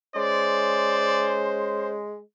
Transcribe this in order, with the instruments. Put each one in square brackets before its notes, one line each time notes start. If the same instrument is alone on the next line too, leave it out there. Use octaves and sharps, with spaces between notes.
[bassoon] G#3 [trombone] C#4 [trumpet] C5 [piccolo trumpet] D5